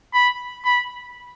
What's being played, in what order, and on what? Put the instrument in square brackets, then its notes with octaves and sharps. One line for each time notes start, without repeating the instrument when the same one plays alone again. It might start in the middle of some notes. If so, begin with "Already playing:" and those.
[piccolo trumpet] B5
B5